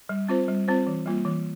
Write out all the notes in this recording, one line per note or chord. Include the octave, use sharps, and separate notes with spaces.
G3
C4 F4 C5
G3
C4 F4 C5
E3
G3 A#3 F4
E3